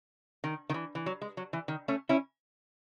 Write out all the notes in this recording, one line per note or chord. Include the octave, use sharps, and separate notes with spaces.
D#3
D#3
E3
E3
F#3
G#3
F#3
E3
D#3
A3 C#4
C#4 E4